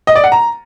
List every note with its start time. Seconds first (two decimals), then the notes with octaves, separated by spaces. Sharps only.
0.07 D#5
0.15 D5
0.24 F#5
0.32 A#5